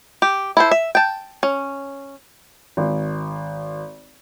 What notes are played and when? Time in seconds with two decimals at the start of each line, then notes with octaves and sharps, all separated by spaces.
0.22 G4
0.57 E4 A4 C5
0.71 E5
0.95 G5 A5
1.43 C#4
2.77 G#1